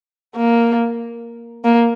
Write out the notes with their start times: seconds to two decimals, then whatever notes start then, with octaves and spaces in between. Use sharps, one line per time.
0.36 A#3
1.64 A#3